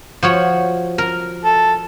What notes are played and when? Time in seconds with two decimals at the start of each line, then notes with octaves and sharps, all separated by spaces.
0.23 F3 F#4 C#5
0.98 A#4
1.45 A4